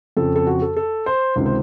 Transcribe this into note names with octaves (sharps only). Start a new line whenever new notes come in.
F2 C#3 F3 A4
A4
F#4
A4
A4
C5
C#2 C3 D#3
C5